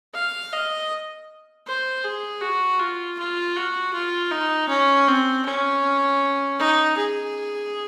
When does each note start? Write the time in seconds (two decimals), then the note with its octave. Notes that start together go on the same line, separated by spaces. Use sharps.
0.15 F5
0.53 D#5
1.67 C5
2.05 G#4
2.42 F#4
2.80 F4
3.19 F4
3.56 F#4
3.94 F4
4.32 D#4
4.69 C#4
5.08 C4
5.45 C#4
6.59 D#4
6.97 G#4